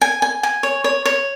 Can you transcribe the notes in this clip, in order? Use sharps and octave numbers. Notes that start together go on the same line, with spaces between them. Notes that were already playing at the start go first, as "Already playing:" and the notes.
G#5
G#5
G#5
C#5
C#5
C#5